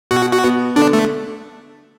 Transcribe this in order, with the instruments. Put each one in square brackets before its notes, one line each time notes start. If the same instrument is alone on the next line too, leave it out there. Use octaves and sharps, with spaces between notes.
[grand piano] B2 [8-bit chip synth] F#4
[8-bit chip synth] F#4
[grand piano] B3
[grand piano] D3 [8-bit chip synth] D4
[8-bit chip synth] A3